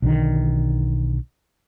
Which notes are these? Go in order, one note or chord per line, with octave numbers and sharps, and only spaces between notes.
B1 D3 D#3